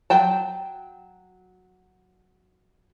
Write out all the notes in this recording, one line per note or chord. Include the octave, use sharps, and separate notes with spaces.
F#3 G5 A5